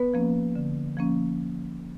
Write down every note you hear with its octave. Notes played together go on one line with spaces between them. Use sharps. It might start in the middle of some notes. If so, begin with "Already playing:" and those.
Already playing: B3 B4
F3 A#3 C#4
D3
F3 A#3 C#4